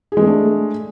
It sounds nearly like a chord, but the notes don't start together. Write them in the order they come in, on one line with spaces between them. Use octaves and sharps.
G#4 G#3 A3 D4